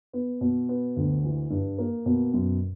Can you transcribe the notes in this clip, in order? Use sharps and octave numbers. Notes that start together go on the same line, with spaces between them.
B3
B2
B3
D2
E3
G2
A#3
B2
F#2